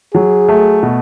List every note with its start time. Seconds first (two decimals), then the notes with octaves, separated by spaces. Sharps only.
0.14 F#3 G#4
0.49 A3
0.83 B2